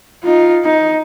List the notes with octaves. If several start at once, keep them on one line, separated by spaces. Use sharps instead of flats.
D#4 F4
D#4